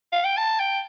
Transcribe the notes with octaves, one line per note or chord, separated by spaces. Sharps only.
F5
G5
A5
G5